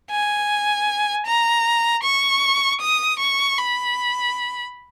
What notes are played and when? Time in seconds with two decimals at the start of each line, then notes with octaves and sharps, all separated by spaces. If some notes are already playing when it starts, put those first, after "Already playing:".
0.11 G#5
1.26 A#5
2.04 C#6
2.81 D#6
3.20 C#6
3.58 B5